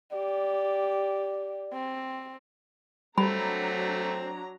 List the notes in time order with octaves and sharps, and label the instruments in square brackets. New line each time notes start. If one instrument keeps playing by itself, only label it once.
[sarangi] G4 [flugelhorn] D5
[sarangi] C4
[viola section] F#3 D4 A#5 [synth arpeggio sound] G3 [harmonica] A3 C4 [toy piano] B5